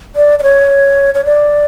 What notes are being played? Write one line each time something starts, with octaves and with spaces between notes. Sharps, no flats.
D5
D5
C#5
C#5
D5